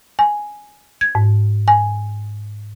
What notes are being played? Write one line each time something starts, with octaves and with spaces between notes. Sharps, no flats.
G#5
G#6
G#2
G#5